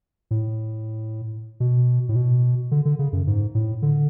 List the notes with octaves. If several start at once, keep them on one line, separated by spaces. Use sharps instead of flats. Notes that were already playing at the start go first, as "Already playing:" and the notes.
A2
B2
A2
B2
D3
D3
C#3
F#2
G#2
A2
D3